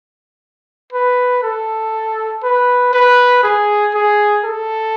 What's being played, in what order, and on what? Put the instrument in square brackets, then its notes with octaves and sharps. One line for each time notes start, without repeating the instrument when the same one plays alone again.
[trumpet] B4
A4
B4
B4
G#4
G#4
A4